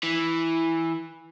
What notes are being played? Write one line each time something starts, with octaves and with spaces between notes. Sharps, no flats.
E3